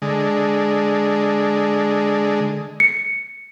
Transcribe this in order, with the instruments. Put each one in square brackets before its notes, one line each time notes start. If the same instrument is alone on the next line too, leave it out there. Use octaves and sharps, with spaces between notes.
[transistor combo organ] D3 G#3
[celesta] C#7